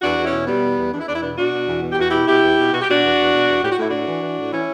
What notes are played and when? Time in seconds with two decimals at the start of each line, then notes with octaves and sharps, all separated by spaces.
0.02 E2 D4 F#4
0.17 E2
0.25 C#4 E4
0.32 B2
0.47 B2 G3 B3
0.62 E2
0.77 E2
0.92 E2 D4
1.00 E4
1.07 E2 D4
1.14 E4
1.21 B2 B3 D4
1.37 B2 D4 F#4
1.52 B2
1.67 E2
1.82 B2
1.92 G4
1.97 E2 F#4
2.10 B2 E4 G4
2.27 B2 E4 G4
2.42 E2
2.57 B2
2.72 B2 F#4
2.81 G4
2.87 B2 D4 F#4
3.02 E2
3.17 E2
3.32 B2
3.47 E2
3.62 A2 G4
3.71 F#4
3.77 A2 E4
3.89 A2 D4 F#4
4.07 E3
4.22 E3
4.37 A2
4.52 E3 C#4 E4